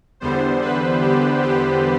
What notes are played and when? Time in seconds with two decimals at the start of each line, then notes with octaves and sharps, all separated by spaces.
0.20 E2 D3 G3 B3 C5
0.61 B4
1.01 G4
1.43 G4